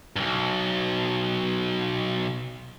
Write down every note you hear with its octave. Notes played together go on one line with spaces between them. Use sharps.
B1 G2